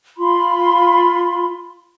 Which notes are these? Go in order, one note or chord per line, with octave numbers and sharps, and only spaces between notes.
F4 B5 C6